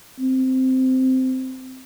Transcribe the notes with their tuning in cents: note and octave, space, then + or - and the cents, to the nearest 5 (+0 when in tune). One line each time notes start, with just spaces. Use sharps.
C4 -10